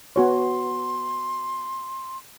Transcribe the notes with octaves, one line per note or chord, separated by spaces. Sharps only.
B3 F#4 C#5 C6